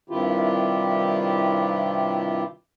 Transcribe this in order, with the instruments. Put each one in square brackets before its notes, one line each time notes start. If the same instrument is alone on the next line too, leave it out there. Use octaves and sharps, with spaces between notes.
[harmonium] G2 C3 D#3 E4 F4 G4